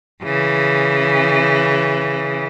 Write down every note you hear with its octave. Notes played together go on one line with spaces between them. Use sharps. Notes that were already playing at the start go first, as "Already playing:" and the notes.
C#3 E3